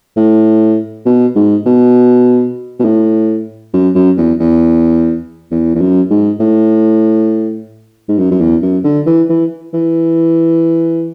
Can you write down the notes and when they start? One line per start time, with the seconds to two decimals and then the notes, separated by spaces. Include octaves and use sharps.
0.17 A2
1.06 B2
1.36 G#2
1.66 B2
2.79 B2
2.85 A2
3.73 F#2
3.95 F#2
4.17 E2
4.40 E2
5.51 E2
5.75 E2
5.81 F#2
6.11 G#2
6.40 A2
8.09 G#2
8.18 F#2
8.31 F#2
8.41 E2
8.62 F#2
8.84 D3
9.06 E3
9.29 E3
9.73 E3